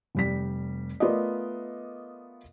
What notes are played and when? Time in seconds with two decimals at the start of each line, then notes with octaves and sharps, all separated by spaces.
0.15 F1 G3 B6
1.00 A3 B3 F4 A#4 D5 D#5